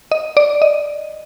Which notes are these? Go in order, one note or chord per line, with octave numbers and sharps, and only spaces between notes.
D#5
D5
D#5